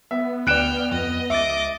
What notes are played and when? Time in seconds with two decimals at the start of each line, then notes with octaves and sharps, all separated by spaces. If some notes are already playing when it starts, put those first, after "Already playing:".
0.11 B3 E5
0.47 D2 D5 G5 F6 F#6 D7 E7
0.92 F2 D#5
1.30 C#2 D#5 E5 D6 A6